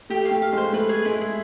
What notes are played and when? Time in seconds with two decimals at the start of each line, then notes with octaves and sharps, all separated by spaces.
0.10 A3 G4
0.25 F5
0.31 A3
0.42 F5
0.53 G#3 C5
0.73 A3 B4
0.89 G#4
1.05 G#3 E4
1.21 G#4